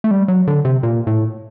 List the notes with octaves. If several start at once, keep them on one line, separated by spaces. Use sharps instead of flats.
A3
G3
F#3
D3
C3
A#2
A2